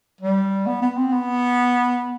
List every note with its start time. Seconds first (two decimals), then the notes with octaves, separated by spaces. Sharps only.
0.21 G3
0.66 B3
0.82 B3
0.97 C4
1.12 B3